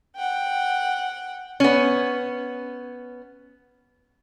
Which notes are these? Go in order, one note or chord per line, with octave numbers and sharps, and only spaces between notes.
F#5 G5
B3 C#4